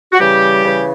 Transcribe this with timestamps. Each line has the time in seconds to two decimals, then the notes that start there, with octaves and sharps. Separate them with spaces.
0.12 F#4
0.18 C#3 E3 G3 G4
0.63 C#3 E3